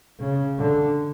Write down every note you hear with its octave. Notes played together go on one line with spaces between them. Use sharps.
C#3
D3